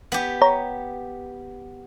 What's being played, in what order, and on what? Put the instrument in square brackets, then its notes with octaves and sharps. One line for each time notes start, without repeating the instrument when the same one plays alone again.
[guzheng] B3 G4
[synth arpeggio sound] C#5 A#5